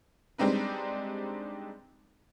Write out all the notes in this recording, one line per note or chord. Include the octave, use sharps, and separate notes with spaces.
G3 G#3 C4 D4 D#4 B4